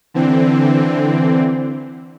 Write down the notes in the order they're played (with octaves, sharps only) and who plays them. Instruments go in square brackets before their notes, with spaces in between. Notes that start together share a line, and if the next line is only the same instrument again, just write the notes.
[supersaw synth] D3 E3 C4